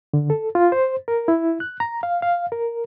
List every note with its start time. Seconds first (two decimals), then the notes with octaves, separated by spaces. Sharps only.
0.13 D3
0.30 A4
0.55 F4
0.72 C5
1.08 A#4
1.28 E4
1.60 F#6
1.80 A#5
2.03 F5
2.22 F5
2.52 A#4